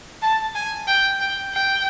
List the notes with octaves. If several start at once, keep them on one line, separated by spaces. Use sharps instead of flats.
A5
G#5
G5
G5
G5